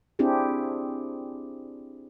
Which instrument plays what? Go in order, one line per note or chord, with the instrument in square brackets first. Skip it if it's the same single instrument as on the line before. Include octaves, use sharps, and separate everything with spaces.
[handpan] C4 D4 E4 G4 G#4